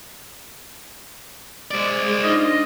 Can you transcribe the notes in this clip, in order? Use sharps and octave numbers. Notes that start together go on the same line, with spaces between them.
G#3 C5 D5
D4 D#4 F4 D#5